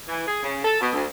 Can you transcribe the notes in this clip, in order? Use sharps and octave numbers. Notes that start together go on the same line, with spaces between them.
E3
G#4
C#3
A4
B2
D2